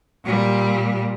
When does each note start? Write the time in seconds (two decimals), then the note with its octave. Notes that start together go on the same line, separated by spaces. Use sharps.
0.25 A#2 G3